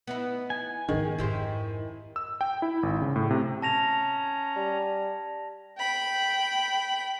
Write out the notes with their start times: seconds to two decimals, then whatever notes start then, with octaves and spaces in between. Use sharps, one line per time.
0.07 B3 D#4 E4
0.50 G#5
0.89 G#2 D#3 B3 G#4
1.19 F2 G#2 E4 G4 C5
2.16 E6
2.41 G5
2.62 E4
2.83 G#1
3.02 C#3
3.16 A2
3.31 C3
3.62 C#4 A5 A#5 A#6 F7
4.56 G3
5.78 G5 B5